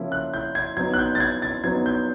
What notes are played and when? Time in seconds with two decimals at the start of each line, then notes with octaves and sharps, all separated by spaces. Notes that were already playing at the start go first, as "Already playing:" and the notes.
Already playing: C#3 F3 A#3 C#4 E4
0.12 F#6
0.34 G6
0.55 G#6
0.77 F#3 B3 D#4 G#6
0.94 F#6
0.99 G6
1.15 A6
1.20 G#6
1.42 A6
1.64 F#3 B3 D#4 G#6
1.86 G6